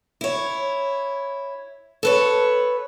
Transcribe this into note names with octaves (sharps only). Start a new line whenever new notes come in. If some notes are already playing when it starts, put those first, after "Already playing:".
E4 C#5
A4 B4 C#5